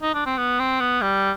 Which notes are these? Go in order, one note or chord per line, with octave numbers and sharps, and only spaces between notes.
D#4
D4
C4
B3
C4
B3
G3